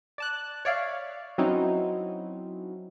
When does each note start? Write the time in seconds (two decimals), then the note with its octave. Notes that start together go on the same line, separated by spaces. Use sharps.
0.18 D5 A5 F#6
0.65 C#5 D5 E5 F5
1.38 F#3 C4 C#4 D#4 E4